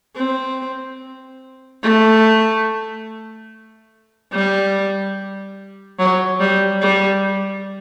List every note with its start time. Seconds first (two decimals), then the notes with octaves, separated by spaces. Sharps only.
0.16 C4
1.83 A3
4.32 G3
5.99 F#3
6.40 G3
6.82 G3